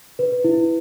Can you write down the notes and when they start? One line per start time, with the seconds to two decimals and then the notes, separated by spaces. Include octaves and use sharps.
0.19 B4
0.44 E4